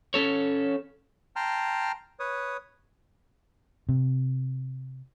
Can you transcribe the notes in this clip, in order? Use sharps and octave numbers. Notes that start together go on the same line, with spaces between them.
C#4 A4 C#5
G5 A5 A#5 C6 F6
B4 C#5 D#6
C3